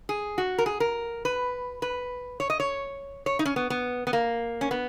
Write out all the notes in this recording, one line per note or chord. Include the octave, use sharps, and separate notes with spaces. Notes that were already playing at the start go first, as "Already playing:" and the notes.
G#4
F#4
A#4
G#4
A#4
B4
B4
C#5
D#5
C#5
C#5
D#4
C#4
B3
B3
B3
A#3
C#4
B3